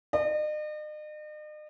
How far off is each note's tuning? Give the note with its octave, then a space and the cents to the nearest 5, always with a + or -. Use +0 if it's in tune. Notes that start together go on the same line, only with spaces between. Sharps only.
D#5 -45